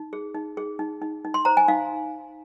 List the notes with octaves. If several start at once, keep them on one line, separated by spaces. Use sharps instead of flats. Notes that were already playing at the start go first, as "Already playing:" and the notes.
Already playing: D#4
G#4
D#4
G#4
D#4
D#4
D#4
C6
C5 A#5
G#5
D#4 F5